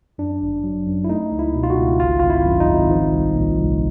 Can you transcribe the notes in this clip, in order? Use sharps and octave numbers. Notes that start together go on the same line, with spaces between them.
F#2 D4
G1
F#3
F#2
E4
A3 D#4
C#2
E4
B2
F4
F#4
C#2
G#1 F4
G#1 F4
E4
F#2
D#4
G#1
F3
C2
A#2
C2